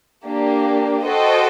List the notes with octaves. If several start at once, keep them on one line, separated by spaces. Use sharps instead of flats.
A#3 D4 G4
F#4 A4 C5 D#5 G5